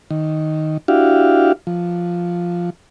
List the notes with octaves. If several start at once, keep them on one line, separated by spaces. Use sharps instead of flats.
D#3
D4 E4 F#4 G4 F5
F3